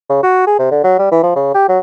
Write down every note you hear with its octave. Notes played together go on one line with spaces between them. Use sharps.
C#3
F#4
G#4
C3
D3
F#3
G3
E3
F3
C#3
G4
F#3